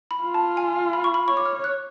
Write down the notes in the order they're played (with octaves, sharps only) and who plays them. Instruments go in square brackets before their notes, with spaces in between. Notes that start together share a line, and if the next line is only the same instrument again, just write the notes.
[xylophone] B5
[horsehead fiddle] F4
[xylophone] A5
G#5
B5
C#6
B5
[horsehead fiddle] C#5 [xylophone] C#6
[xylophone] D6
F6
F#6